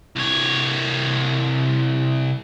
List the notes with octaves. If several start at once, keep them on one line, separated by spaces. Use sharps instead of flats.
C2 C#5